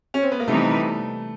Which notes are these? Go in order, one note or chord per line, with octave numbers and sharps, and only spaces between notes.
C#4
C4
B3
A#3
C3 E3 G3 A3 B3 D#4